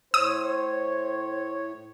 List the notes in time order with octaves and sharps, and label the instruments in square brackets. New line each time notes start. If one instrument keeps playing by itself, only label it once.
[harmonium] A2 C#5 [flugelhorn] C5 [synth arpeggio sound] D#6